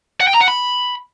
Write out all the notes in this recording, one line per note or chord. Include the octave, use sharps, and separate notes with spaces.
F#5
G5
A#5
F#5
B5